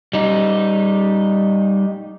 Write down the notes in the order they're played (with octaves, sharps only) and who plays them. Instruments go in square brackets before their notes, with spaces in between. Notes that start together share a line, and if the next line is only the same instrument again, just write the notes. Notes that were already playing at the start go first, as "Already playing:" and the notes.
[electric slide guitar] G3 D#4